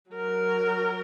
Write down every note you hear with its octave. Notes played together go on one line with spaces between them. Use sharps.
F#3 A#4